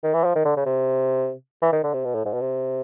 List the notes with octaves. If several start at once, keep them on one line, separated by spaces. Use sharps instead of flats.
D#3
E3
F3
D#3
D3
C#3
C3
E3
D#3
D3
C3
B2
A2
G#2
B2
C3